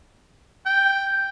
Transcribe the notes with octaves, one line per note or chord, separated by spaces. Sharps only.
G5